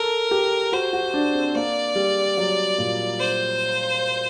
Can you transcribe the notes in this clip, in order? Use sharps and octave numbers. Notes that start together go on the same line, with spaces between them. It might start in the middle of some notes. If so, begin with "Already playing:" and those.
Already playing: A4 A#4
G4
F#4 C5
F#4
D4
C4
A#3 D5
G3
F#3
A#2
C5